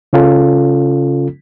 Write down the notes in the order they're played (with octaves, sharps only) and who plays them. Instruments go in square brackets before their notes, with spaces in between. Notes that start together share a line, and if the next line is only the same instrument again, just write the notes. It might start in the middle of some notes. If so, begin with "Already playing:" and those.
[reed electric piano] C#3 C#4 F4 A4